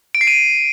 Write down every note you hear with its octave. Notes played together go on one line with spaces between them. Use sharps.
D7
C7
D#7